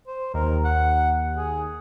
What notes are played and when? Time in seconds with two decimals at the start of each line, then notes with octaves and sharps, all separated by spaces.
0.07 C5
0.34 D#2 A#4
0.65 F#5
1.37 G#4